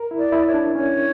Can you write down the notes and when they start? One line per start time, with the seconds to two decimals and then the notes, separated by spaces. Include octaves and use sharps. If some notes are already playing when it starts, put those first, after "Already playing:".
Already playing: A#4
0.11 E4
0.18 D5
0.32 E4
0.46 C#5
0.54 D4
0.75 C#4 C#5